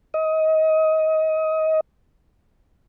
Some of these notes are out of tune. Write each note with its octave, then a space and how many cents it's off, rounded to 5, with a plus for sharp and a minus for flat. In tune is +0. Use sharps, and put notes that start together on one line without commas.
D#5 +25